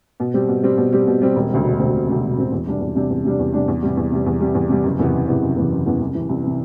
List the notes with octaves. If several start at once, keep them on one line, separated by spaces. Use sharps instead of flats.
B2
G3 C4 G4
B2
G3 C4 G4
B2
G3 C4 G4
B2
G3 C4 G4
E1
D2 C3 F#3 C4
E1
D2 C3 F#3 C4
E1
D2 C3 F#3 C4
E1
D2 C3 F#3 C4
E2
C3 G3 D4
E2
C3 G3 D4
E2
C3 G3 D4
E2
C3 G3 D4
E2
C3 G3
E2
C3 G3
E2
C3 G3
E2
C3 G3
F#1
E2 C3 E3 B3
F#1
E2 C3 E3 B3
F#1
E2 C3 E3 B3
F#1
E2 C3 E3 B3
C2
C3 E3
C2
C3 E3